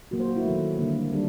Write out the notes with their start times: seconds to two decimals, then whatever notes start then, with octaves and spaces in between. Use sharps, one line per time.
0.11 A#2 F#3 A#3 F#4
0.20 C5
0.28 F#4
0.36 E4
0.45 D#3 F#3 A3
0.79 D3 G3 A#3
1.12 D#3 G3 D4